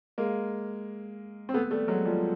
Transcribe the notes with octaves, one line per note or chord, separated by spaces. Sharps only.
G#3 A#3
C4
A3 B3
G3 A3
F#3 G#3
F3 G3